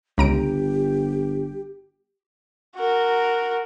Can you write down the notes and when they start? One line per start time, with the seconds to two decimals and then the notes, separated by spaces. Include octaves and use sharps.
0.18 G1 C#2 G4 A#5 D7
2.76 F#4 A#4